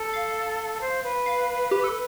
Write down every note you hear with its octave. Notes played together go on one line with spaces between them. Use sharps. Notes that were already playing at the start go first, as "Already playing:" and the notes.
Already playing: A4
F5
C5
B4
F5
G4
A4